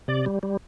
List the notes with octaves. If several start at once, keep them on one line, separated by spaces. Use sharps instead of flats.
C3 D5
G3
G3